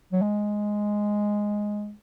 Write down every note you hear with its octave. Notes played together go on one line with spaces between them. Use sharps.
F#3
G#3